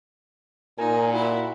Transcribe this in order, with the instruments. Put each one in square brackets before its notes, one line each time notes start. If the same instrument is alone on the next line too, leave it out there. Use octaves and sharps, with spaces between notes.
[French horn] A#2 [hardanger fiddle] D#4 [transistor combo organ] A#4 G#5
[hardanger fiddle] E4 [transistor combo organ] F#4